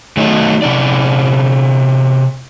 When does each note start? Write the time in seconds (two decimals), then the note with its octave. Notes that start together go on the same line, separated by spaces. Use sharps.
0.17 D#3 F#3 A3 D#4
0.62 C3 C#4 D5